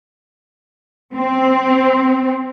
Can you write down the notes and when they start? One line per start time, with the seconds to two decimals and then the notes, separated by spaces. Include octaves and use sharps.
1.13 C4